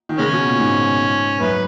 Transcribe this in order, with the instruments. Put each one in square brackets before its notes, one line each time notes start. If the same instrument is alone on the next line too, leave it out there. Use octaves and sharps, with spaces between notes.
[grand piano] D#3
[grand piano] C#3 [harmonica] G#3 C#4
[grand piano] B2
A#2
G#2
[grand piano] F#2 [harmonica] B4